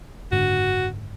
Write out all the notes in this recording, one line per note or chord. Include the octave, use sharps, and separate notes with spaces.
F#1 G#2 D3 F#4